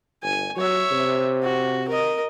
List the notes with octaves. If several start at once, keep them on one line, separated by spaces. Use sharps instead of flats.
G1 G#5
F#3 C#5 E5
C3
F#4
A#4 D#5